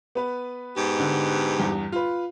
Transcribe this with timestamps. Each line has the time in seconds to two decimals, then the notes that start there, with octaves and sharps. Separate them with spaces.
0.15 B3 B4
0.75 G#2 B2 G4
1.00 D3
1.60 E2 G2
1.92 F4 B4